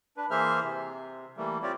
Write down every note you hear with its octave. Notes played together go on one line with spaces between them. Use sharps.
D4 B4
E3 A#3 G#4 C5 E5 F6
C3
E3 G3 A3 A#3
C4 F4 G4 C#5 D5